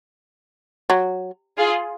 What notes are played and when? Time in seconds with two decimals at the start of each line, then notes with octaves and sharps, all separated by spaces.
0.90 F#3
1.58 F4 G#4